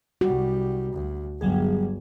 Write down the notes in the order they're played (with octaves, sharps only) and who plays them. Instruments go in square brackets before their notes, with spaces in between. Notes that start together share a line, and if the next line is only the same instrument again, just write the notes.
[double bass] C2 G3 [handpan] F#4
[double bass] D2
[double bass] G1 [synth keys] F#3 G3 G#4